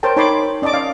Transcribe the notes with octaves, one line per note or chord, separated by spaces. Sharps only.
A#4 C5 C#5 G5 A5
D#4 C#5 A5 B5 C6 D6
C#4 D5 D#5 A5 D6
F5